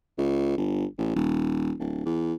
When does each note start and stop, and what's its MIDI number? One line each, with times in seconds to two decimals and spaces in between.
0.18 0.53 37
0.58 0.85 31
0.98 1.15 33
1.16 1.73 27
1.79 2.03 26
2.05 2.34 40